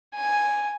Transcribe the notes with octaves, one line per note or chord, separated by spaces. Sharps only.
G#5